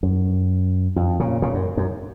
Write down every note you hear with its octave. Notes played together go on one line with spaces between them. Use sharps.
F#2
F2
A#2 C#3
A#2 C#3
F#2
F#2